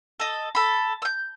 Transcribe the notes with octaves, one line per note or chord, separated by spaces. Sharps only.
A4 D#5
A4 B5
E6 G6